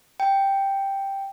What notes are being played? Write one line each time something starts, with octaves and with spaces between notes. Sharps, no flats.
G5